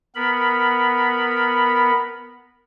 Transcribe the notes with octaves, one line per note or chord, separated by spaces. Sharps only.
B3 A#4 B5